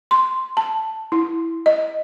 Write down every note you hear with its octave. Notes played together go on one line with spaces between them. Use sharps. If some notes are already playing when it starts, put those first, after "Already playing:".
C6
A5
E4
D#5